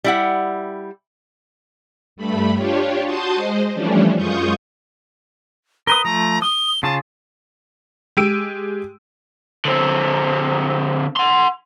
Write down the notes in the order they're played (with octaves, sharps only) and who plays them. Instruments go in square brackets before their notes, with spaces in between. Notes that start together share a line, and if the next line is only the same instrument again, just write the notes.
[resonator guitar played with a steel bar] G3 E4 F#5
[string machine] G2 A3 B5
D4 F4 G4 C#5
F#4 A5 C6 D#6 G6 A6
G#3 C5 D#5
E3 F3 G3 A3 C#4 D4
F#2 G#3 F4 C#6 D#6 G6
[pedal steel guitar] A#4 B4 D#6 [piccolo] G7
[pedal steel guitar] F3 A3 [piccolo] A#5
[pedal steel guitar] D#6 [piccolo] G7
[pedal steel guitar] C#3 F4 G#4 [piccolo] A5
[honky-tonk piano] G#3 G4 E6 D7 D#7
[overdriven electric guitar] D3 C4
F#5 C6